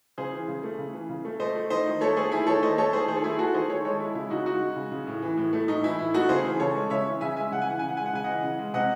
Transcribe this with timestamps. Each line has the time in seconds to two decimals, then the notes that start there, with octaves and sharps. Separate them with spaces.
0.18 C#3 G#4 C5
0.32 E3
0.48 C#3
0.63 A3
0.78 C#3
0.94 E3
1.09 C#3
1.25 A3
1.40 A3 C5 D#5
1.55 A3
1.70 D#3 C5 D#5
1.86 D#3
2.01 A3 A4 C#5
2.17 A3 G#4 C5
2.31 D#3 E4 G#4
2.47 D#3 A4 C#5
2.62 A3 C5 D#5
2.77 A3 A4 C#5
2.93 D#3 G#4 C5
3.08 D#3 G#4 C5
3.17 A4
3.23 A3 E4 G#4
3.39 A3 F#4 A4
3.54 D#3 G#4 C5
3.69 D#3 A4 C#5
3.85 G#3 A4 C#5
4.00 G#3 E4
4.15 C#3 E4
4.30 C#3 D#4 F#4
4.46 G#3 D#4 F#4
4.61 G#3
4.76 C#3
4.92 C#3
5.07 A2
5.22 E3
5.37 A2
5.53 A3
5.68 A2 D#4
5.83 E3 E4
5.99 A2 E4
6.14 A3 D#4 F#4
6.29 C#3 G#4 C5
6.45 E3
6.60 C#3 A4 C#5
6.76 G#3
6.90 C#3 C#5 E5
7.06 E3
7.21 C#3 E5 G#5
7.36 G#3 E5 G#5
7.52 C#3 F#5
7.62 G#5
7.67 E3 F#5
7.79 C#3 G#5
7.89 F#5
7.97 G#3 G#5
8.06 F#5
8.13 C#3 G#5
8.24 E3 D#5 F#5
8.43 C#3
8.59 G#3
8.74 C3 D#5 F#5